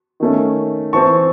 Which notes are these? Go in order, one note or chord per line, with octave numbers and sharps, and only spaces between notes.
D#3 A3 C#4
E3 C4 A5 C#6